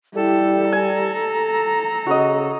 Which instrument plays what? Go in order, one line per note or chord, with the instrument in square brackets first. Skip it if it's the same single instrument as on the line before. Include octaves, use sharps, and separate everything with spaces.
[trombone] G3 [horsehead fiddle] E4 G4 [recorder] A4
[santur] G#5 [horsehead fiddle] A#5
[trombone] C#3 [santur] F#4 D#5